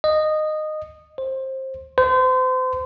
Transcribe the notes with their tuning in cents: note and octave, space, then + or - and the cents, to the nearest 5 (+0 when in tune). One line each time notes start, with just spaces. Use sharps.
D#5 -15
C5 +20
C5 -35